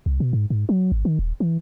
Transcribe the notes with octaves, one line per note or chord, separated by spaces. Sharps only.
C2
B2
G#2
G#2
F#3
G#1
D#3
D#1
E3